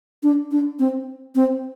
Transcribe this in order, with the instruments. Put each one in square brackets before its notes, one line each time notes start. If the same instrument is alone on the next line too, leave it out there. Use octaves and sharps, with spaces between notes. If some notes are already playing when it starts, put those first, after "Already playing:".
[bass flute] D4
D4
C4
C4